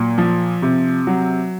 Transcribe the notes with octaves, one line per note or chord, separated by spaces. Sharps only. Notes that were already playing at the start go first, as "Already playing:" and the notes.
Already playing: A#2 F#3
F3
C3
F#3